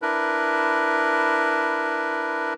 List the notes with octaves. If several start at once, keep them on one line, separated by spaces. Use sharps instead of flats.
D4 E4 A#4 B4